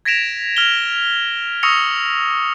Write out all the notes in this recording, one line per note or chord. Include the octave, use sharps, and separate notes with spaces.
G#6 A#6 B6 D7 E7 F7
F6 F7 G7
C#6 D#6 E6 A#6 C#7 F7